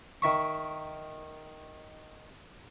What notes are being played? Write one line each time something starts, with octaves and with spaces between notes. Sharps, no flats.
D#3 E5 C#6